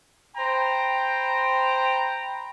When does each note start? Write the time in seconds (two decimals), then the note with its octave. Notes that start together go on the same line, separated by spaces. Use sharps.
0.36 C5 G5 A#5 B5